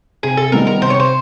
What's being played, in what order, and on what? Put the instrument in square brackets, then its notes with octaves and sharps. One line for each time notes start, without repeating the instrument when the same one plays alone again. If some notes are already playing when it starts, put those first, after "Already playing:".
[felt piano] C3 [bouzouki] G#4
[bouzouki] A4
[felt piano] D#3 G3 B3 [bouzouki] A#4
[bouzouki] A#4
[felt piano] C3 [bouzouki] C5
[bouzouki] C#5
C5